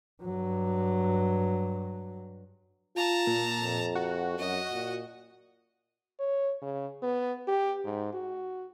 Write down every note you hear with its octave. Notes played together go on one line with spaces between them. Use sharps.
G2 F#3
F4 A5 A#5
A#2
F2
F#4
F#2 D#5
A#2
C#5
C#3
B3
G4
G#2
F#4